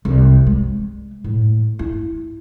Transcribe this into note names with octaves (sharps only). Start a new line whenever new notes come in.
C2
G#3
A2
E4